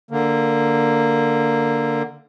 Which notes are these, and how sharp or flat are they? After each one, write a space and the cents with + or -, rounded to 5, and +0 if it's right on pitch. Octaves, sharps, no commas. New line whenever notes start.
D3 +0 A#3 -10